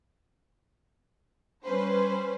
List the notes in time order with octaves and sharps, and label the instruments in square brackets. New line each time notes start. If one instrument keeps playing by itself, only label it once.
[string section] G3 C#4 B4 C5